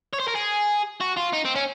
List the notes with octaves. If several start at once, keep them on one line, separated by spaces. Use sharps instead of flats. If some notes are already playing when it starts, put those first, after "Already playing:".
C#5
C5
A#4
G#4
F#4
F4
D#4
C4
C#4